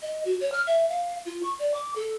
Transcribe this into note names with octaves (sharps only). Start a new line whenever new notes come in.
D#5
F#4
C#5
F6
E5
F5
F4
C#6
D5
D6
A4